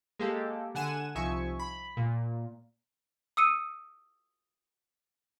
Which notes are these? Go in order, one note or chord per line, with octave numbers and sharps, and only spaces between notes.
G#3 A#3 G4 A4
D3 F#5 G#5 E7
C2 F3 D#4 E5 G#5 C#6
B5
A#2
D#6 E6 C#7 D#7